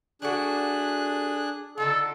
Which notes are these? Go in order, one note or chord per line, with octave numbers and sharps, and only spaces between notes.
G3 A3 D4 F#4 G#4 F#6
D3 D#4 F4 A4